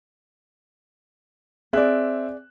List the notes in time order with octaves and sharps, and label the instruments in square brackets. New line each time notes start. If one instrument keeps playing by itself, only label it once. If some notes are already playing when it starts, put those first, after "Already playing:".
[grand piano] C4 E5 F#6 [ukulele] G#4 D5